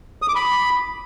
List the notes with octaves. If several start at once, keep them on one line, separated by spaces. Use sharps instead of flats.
D#6
D6
B5